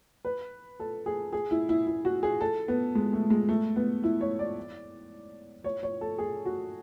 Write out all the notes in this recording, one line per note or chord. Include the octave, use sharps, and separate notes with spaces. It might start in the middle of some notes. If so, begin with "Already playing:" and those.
B4
A4
G#4
G#4
E4
E4
E4
F#4
G#4
A4
B3
G#3
A3
G#3
A3
B3
E4
C#5
D5
C#5
C#5
A4
G#4
F#4